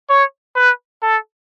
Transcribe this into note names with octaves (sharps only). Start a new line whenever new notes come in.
C#5
B4
A4